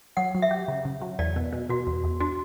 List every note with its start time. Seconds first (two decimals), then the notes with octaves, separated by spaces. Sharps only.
0.17 F#3 F#5
0.35 F#3
0.42 E5
0.51 G4
0.68 C#3
0.85 C#3
1.02 F#3
1.19 E2 D5
1.36 B2
1.53 B2
1.70 B2 F#4
1.87 E2
2.04 E2
2.20 D4 F#4